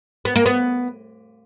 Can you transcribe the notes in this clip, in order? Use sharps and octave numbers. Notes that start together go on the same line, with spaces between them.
B3
A#3
B3